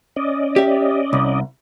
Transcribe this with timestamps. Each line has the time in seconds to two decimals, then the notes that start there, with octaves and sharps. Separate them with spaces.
0.16 C#4 D5 D#5
0.56 G4 E5
1.13 C2